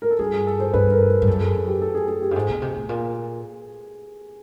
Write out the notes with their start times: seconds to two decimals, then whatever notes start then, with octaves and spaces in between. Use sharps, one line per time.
0.02 A#4
0.11 A4
0.19 G2 G#4
0.33 G#4
0.47 A4
0.60 C5
0.74 G2 B4
0.92 A#4
1.09 A#4
1.22 G2
1.27 F#2 A4
1.41 G#4
1.67 G4
1.82 A4
1.95 G#4
2.08 G#4
2.22 G4
2.31 G2
2.35 G#2 G#4
2.49 B2
2.62 C3
2.76 A2
2.89 A#2